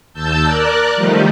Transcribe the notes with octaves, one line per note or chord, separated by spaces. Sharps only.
D#2 A5 E6 G6
A#4 D5 F#6
D#3 F3 G3 A3 D#4 G4